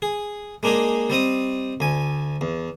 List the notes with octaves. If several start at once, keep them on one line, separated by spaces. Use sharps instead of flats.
G#4
G#3 A#3 D4 D#4 G#4
G3 C4 D#5 D#6
D2 G#5
E2